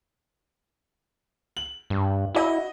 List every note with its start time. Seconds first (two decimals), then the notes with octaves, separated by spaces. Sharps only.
1.57 F#7
1.90 G2
2.35 E4 F#4 D#5